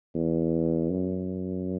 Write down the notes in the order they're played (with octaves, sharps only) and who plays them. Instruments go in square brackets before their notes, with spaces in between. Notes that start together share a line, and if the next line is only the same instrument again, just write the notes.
[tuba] E2
F#2